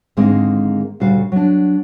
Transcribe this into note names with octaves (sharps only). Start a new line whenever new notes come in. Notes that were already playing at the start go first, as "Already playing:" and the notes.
G#2 D3 D#3 G#3 A#3 C4
D2 A#2 C#3 G3 F#4 F5
F#3 D4